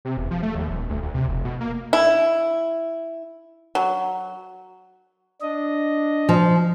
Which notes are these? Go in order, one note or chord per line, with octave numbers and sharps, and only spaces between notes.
C3
E1
F3
A3
D#2
D#1
D2
D2
C3
F1
B2
A#3
E4
F#3
D4 D#5
F3